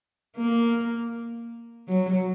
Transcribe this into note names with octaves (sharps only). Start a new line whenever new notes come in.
A#3
F#3